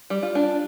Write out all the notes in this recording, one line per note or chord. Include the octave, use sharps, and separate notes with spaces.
G3
F4
D4